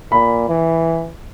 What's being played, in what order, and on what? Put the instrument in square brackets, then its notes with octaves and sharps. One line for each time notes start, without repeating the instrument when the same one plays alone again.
[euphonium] A#2 [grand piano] B5
[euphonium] E3